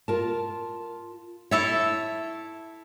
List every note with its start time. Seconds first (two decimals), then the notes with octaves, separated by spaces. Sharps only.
0.08 F4 A#4 A5
1.51 E4 A4 C#5 E5